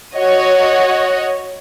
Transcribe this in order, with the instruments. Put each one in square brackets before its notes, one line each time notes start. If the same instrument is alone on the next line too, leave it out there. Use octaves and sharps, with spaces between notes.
[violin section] F#4 C#5 D#5